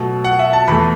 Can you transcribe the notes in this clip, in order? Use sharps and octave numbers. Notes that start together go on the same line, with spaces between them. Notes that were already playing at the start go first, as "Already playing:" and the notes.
Already playing: B2 F#3 A3
F#5
E5
A5
E2 E3 A3 B5